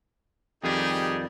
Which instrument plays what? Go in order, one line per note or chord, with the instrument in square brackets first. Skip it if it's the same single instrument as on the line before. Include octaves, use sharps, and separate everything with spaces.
[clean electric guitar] F2 D#3 G3 [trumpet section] D#4 G4 G#4